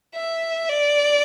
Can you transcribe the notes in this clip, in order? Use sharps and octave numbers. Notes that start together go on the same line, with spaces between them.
E5
D5